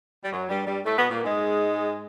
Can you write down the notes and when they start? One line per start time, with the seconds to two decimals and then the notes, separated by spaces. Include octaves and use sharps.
0.24 G3
0.31 F#2 F#3
0.49 G2 G3
0.67 G2 G3
0.84 A2 A3
0.97 B2 B3
1.10 A#2 A#3
1.23 G#2 G#3